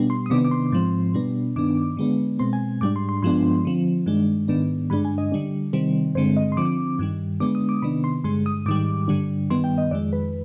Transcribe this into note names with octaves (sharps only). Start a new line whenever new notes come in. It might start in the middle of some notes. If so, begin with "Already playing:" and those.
Already playing: B2 G3 B3 D4
C6
D#6
C3 D#3 B3 D4 D6
D6
C6
G#2 F3 C4
B2 G3 B3 D4
G2 D#3 B3 D4 D6
D3 G#3 B3 D4
B2 G#3 C4 C6
G#5
G#2 G3 D4 D6
C6
C6
G2 F3 G#3 B3 D4 C6
D3 F3 C4
G2 D#3 G#3 D4
G#2 D#3 B3 D4
G2 D3 G#3 D4 B5
G#5
D#5
D3 G3 D4
C3 D#3 G3 C4
G2 D3 G#3 C4 C5
D#5
C6
D3 F3 C4 D6
G2 D#3 G3
D3 G#3 B3 D4 D6
D#6
D6
C3 D#3 B3 D4 B5
C6
G2 D3 G#3 C6
D#6
G#2 D#3 G3 D6
G2 D3 G3 D4
G2 D#3 G3 B3 C6
G5
D#5
F2 D#3 G#3 D5
B4